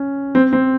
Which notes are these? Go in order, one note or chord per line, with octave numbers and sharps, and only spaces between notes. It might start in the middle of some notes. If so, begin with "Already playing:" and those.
Already playing: C#4
C4
C4